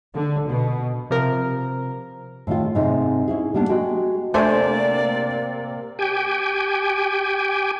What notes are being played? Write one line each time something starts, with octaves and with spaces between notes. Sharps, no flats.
D3
B2
C3 F3 A#4
A2 D#3 G#3 F4
G#2 C3 D#4
C#4 E4 G#4
G3 A#3 B3 D4
G#3 F#4 G#4 G5
C3 A3 A#3 D4 C5 D5 G#5
G4 G5 G#5